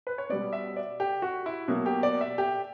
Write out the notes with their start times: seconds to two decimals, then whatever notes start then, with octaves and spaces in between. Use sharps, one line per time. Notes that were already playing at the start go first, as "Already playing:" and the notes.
0.07 B4
0.18 C#5
0.29 B2 G3 B3 D5
0.53 E5
0.76 D5
1.00 G4
1.22 F#4
1.46 E4
1.68 B2 F#3 A#3
1.86 G4
2.03 D5
2.21 E5
2.38 G4